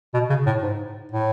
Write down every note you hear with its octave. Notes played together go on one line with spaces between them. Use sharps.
B2
C#3
A2
G#2
A2